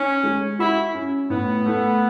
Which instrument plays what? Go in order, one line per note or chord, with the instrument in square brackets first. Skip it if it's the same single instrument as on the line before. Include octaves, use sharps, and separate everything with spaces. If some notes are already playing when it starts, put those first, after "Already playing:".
Already playing: [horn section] C#4 [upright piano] D#4
[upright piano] G#3
[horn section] E4 [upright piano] F#4
[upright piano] C#4
[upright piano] A2 [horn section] B3
[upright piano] A3